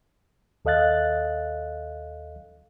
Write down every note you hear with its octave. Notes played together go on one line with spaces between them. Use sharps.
D#2 A4 D#5 F5 F#6 A6